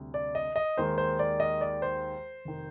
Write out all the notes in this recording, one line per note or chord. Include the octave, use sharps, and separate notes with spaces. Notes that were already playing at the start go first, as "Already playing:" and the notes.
Already playing: D2 C3 G3
D5
D#5
D#5
D#2 D#3 G#3 C5
C5
D5
D#5
D5
C5
F1 D#3